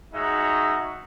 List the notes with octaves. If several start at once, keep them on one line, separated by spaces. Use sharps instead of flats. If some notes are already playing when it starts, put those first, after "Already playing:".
G#3 D#4 F#4 C#5 E5